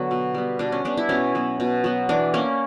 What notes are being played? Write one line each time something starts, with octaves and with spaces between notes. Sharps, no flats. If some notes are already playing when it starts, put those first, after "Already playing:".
Already playing: D3 F#3 B3
B2
G3 B3
B2 D4
C#4
G3 B3 D4
E4
B2 C#4
F#3 B3
B2
F#3 B3
E3 D4
A#3 C#4